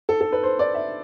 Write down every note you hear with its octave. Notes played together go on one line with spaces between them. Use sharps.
A4
A4
B4
C5
D5
E5